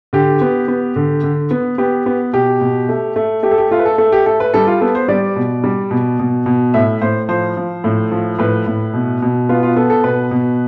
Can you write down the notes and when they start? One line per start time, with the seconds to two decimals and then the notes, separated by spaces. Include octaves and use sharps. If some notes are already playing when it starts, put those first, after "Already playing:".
0.13 D3 G4
0.41 B3
0.68 B3
0.96 D3
1.23 D3
1.51 B3
1.78 B3 G4
2.06 B3
2.33 B2 G4
2.61 B2
2.89 A3
3.16 A3
3.43 A3 G4
3.51 A4
3.58 G4
3.71 A3 F4
3.79 B4
3.85 A4
3.98 A3 A4
4.12 G4
4.26 A3 A4
4.40 B4
4.54 G3 A4
4.67 F4
4.81 B3 A4
4.95 C5
5.08 G3 D5
5.36 B2
5.64 G3
5.91 B2
6.19 B2
6.46 B2
6.74 A2 E5
7.01 A2 C5
7.29 F3 C5
7.57 F3
7.84 A2
8.11 F3
8.39 A2 B4
8.67 A2
8.93 B2
9.22 B2
9.49 B3 F4
9.63 F4
9.76 B3 A4
9.90 A4
10.04 B2 B4
10.31 B2